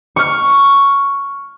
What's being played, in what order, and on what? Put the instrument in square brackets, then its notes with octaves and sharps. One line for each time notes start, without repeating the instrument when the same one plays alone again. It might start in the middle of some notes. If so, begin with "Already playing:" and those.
[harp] C#6 F6